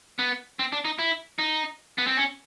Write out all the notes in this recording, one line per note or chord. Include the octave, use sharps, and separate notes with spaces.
B3
C4
D4
D#4
E4
D#4
B3
C4
C#4